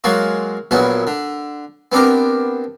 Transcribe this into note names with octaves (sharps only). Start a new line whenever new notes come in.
F#3 G#3 A#3 F4 F#4
A#1 A#2 F#3 B3 E4
D3
B3 C4 D4 G4 A#4